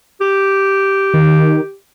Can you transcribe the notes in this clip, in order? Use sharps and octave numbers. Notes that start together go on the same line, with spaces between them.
G4
D#3